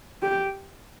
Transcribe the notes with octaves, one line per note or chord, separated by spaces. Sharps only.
G4